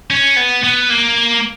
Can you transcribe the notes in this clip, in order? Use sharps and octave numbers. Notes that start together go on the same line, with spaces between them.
C#4
B3
B3
A#3